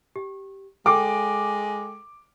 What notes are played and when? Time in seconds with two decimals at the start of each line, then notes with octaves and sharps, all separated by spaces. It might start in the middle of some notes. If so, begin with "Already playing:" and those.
0.16 G4
0.86 G#3 A4 G5 D6